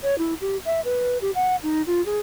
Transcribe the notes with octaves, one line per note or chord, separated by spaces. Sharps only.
C#5
E4
G4
E5
B4
G4
F#5
D#4
F4
G#4